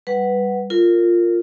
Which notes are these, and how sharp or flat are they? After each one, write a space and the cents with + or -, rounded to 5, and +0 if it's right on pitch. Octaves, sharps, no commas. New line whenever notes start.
G3 +0 B4 +0 F#5 +0
F4 -5 A#4 -20